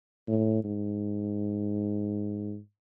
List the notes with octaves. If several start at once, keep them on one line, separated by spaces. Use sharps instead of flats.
A2
G#2